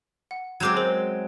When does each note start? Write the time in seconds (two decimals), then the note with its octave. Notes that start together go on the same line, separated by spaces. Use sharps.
0.31 F#5
0.60 F#3 G#3 C4 D6 G6 G#6
0.76 G#4 A#4 C5